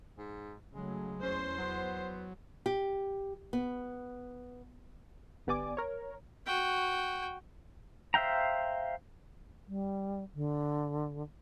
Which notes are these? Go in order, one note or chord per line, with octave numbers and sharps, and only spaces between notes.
G#2
C#3 F#3 G#3 A3
E2 C#4 C5
F#3 B3
G4
B3
G1 B3 G4 D5 G#5 D6
A#4 C#5
F#4 G5
C5 E5 F5 G5 A#5
G3
D3